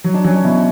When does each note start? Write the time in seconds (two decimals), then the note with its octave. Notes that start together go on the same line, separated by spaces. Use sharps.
0.04 F#3
0.14 D4
0.24 F#3 C#4
0.34 D4
0.44 B2 E4